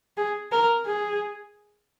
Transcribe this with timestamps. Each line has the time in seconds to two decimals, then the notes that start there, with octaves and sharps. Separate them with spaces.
0.17 G#4
0.52 A#4
0.86 G#4